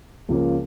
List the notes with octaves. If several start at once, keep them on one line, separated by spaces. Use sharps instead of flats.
C#2 C#3 F3 A#3 C#4